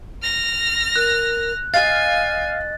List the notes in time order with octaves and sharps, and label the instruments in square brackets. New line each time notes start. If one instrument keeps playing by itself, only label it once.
[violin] F6 A#6
[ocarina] A#4 [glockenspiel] F#6
[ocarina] D#5 [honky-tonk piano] F5 [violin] G#5 [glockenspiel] A6